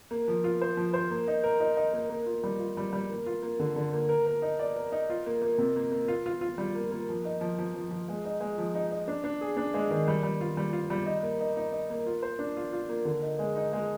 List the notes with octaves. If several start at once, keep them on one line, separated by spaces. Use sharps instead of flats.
A#3
F3
F4
C5
F3
C5
A#3
D#4
A#4
D#4
D#4
A#3
A#3
F4
G3
F4
G3
G3
A#3
F4
A#3
D3
D3
A#3
A#4
A#4
D#4
D5
A#4
D#4
F4
A#3
A#3
C3
A#3
A#3
F4
F4
F4
G3
A#3
A#3
F3
D#4
F3
F3
F3
F3
G#3
D#4
G#3
F3
D#4
D#4
D4
D4
G#4
D4
G#3
D#3
G3
G3
F4
G3
F4
G3
D#4
A#3
D#4
D#4
D#4
A#3
F4
C5
D4
F4
F4
A#3
D3
D#4
G#3
D#4
G#3